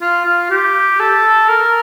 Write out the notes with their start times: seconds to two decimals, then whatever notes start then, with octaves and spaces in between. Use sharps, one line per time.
0.02 F4
0.26 F4
0.50 G4
1.00 A4
1.49 A#4